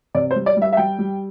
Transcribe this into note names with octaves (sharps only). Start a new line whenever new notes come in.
C3 D5
C5
G3
D5
G3 E5
E5
G3 G5
G3